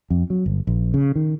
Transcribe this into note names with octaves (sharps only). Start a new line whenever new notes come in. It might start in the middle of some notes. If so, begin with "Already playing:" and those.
F2
F#3
G1
A#1
C#3
D#3